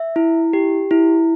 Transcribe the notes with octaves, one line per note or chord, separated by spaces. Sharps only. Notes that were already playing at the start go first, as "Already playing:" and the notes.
Already playing: E5
E4
G4
E4